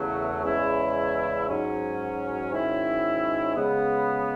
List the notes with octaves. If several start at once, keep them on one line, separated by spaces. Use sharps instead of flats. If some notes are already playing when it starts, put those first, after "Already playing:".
Already playing: E2 C#3 F#3 A3
E2 C#3 G#3 C#4 E4
G#2 F#3 C#4
G#2 D#3 F#3 C#4 E4
C#3 G#3 B3